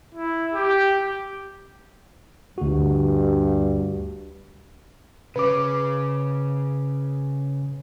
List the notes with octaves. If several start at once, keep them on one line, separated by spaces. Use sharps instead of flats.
E4
G4
D2 G2 F#4
C#3 C#4 B4 D6